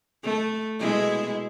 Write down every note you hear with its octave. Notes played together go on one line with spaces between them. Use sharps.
A3
B2 G#3 E4